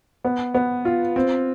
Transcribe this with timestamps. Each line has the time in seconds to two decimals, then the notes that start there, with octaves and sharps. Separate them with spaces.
0.24 B3
0.54 B3
0.85 F4
1.16 C4